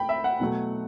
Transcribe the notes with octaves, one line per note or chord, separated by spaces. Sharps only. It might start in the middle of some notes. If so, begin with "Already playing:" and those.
Already playing: A3 G5 B5
E5
F#5
B2 F#3 A3